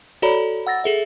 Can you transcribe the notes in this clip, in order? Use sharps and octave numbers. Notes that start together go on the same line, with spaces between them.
F#4 A4 C#5 D5 A#5 B5
F#5 E6 A6 A#6
G#4 A4 E5